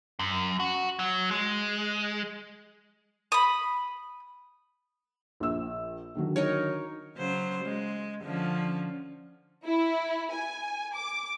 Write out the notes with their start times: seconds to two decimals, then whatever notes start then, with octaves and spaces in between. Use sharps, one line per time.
0.19 F#2
0.60 F#4
0.99 F#3
1.31 G#3
3.32 B5 D#6
5.40 A#1 E6
6.15 D3 D#3 F#3
6.36 D#4 A#4 C#5
7.17 C#3 F#3 C5
7.64 G#3
8.23 D3 F3 C#4
9.64 E4
10.33 G#5
10.94 D6